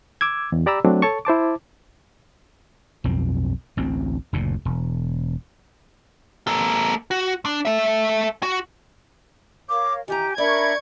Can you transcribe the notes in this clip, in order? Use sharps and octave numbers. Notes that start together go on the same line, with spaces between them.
D6 E6 G#6
E2
G4 D5 A#5 B5 E6
F#3 A3 C4 D4
A4 C#5 A5 C#6
E4 C5 A5 D6
B1 F2 C4
A1 D2 C4
F#1 D2 A#2
E1
A#3 A4
F#4
D4
A4 E5
F#4
A#4 C#5 F5 D6
D#3 E3 G4 G#5 A#5
D4 A#4 D5 E5 B5 C#6 G#6